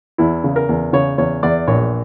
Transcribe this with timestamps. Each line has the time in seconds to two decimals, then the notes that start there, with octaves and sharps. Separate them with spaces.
0.18 E2 E4
0.44 C#3
0.56 A#4
0.69 E2
0.93 C#3 C#5
1.18 E2 C#5
1.43 E2 D5
1.67 A#1 C#5